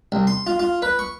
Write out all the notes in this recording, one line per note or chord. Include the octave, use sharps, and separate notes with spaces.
C2
C6
F4
F4
B4
C#6